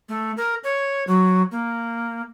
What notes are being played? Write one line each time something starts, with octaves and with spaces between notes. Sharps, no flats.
A3
A#4
C#5
F#3
A#3